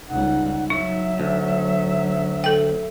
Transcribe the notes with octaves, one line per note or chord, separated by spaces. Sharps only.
C#2 G3 D#4 F#5
F#3 D#4 E5
D2
A4 G5